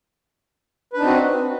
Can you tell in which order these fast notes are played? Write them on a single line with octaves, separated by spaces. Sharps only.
B4 D4 D#4 C4 F#4